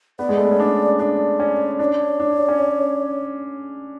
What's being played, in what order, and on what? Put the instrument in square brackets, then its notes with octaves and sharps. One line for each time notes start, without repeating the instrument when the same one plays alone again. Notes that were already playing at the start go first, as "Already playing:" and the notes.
[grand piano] B3 [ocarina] D5
[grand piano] G#3
A3
B3
C#4
D4
[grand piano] D4 [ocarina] D5
[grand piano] C#4
[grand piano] D4 [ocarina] D5
[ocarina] C#5
[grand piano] D4
C#4